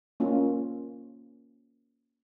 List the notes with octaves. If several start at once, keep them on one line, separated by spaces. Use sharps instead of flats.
A#3 C#4 F4